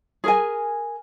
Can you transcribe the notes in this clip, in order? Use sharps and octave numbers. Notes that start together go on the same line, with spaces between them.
G#4 A#4 G#5